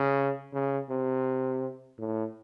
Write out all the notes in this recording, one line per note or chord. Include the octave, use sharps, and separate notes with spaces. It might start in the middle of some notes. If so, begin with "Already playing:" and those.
Already playing: C#3
C#3
C3
A2